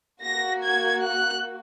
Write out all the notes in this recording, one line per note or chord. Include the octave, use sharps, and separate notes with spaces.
A#3 F#4 A#6
G#6
F#6